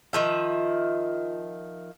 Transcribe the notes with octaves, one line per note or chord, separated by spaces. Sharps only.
D#3 F3 E5